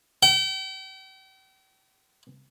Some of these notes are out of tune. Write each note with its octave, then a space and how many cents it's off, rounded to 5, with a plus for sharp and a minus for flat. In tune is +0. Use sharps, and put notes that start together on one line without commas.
G5 -40